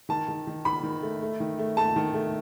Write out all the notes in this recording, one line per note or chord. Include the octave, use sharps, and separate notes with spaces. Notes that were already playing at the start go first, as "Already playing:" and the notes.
D#3 A5
D#3
D#3
D#3 B5
D#3
A3
A3
D#3
A3
A3 A5
D#3
A3